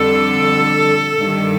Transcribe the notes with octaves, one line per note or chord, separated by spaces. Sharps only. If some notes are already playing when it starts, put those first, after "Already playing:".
Already playing: F2 D3 G3 A4
G2 D#3 G3